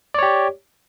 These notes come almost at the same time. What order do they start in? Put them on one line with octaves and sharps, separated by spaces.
D5 C#5 G4